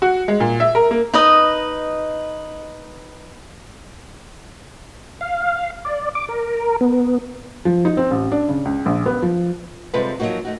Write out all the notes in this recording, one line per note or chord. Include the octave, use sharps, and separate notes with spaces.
F#4
G#3
A#2
E5
A#4
A#3
D#4 B4 D#5
F5
D5
D6
A#4
B3
F3
D#4
C4
A1
D4
C#3
C#2
A#1
B3
F3
C3 G3 G#3 F4 A4 B4
F3 F#3 G#3 A#3 D#4 F#4
A3 D#4 F#4